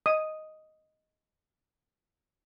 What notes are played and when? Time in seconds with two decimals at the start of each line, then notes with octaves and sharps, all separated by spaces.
0.06 D#5 D#6